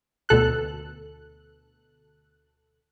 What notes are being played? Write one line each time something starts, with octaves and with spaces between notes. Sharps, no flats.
D2 B2 A4 F#6